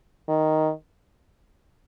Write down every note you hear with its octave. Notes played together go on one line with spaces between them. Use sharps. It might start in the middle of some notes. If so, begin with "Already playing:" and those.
D#3